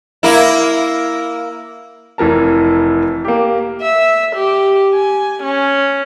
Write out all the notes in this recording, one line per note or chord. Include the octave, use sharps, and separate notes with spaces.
A#3 E4
F1 E3 A#4 A5
A#3 G4
E5
G4
G#5
C#4